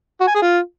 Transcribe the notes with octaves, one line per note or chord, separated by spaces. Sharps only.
F#4
G#5
G#4
F4